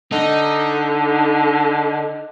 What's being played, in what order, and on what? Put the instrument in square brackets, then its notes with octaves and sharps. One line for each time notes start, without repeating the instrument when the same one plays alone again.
[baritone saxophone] D3 [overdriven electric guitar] D#4